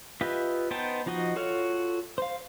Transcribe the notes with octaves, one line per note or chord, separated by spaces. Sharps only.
F4 G4 B4 D#5 E5
B3 D#4 C5 G5 A5
F3 D#4 F#4 D#5
F4 F#4 A4 C#5 F6
C5 F5